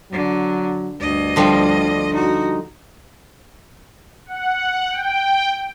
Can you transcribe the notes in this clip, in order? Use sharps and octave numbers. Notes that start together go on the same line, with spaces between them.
D3 F#3
D2 G2 D#5
D3 F3 G3
D#4 F#4
F#5
G5